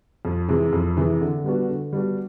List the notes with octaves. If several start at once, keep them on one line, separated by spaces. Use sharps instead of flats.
F2
C3 E3 G#3
F2
C3 E3 G#3
D3
G3 B3 D4 F#4
D3
G3 B3 D4 F#4